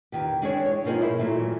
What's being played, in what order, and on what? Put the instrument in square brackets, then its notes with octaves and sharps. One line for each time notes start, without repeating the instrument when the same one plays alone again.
[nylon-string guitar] E2 D#3 G4
G#3 D4 E4 G#4 C#5
C#5
B2 F3 A#3 D#4 G#4
E4
A#2 E3 F#3 A3